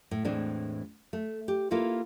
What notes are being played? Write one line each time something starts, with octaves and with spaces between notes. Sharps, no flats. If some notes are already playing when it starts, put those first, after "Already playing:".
A2
E2 A2 E3 G#3 C4 D4
A3
G4
A#3 E4 F4 A4 B4